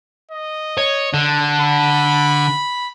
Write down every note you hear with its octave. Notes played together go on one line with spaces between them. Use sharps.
D#5
C#5
D3
B5